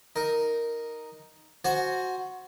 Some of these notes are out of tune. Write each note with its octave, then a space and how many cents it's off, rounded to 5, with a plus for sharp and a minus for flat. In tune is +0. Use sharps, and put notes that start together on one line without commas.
D#4 +0 A#4 +0
F#4 +0 C5 +10 G#5 +30